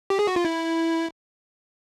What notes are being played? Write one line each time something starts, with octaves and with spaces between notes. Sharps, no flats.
G4
G#4
F#4
F4
E4